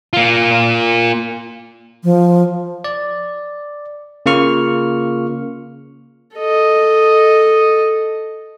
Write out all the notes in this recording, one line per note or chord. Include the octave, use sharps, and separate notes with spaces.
A#3 F4
F3
D5
C#3 A#3 F4 C#6 F6
A4 D#5